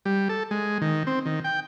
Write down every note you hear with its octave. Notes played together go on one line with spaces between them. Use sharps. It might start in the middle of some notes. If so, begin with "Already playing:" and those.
G3
A4
G#3
D#3
C4
D#3
G5